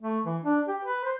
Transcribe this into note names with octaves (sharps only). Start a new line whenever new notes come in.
A3
E3
D4
G4
B4
C5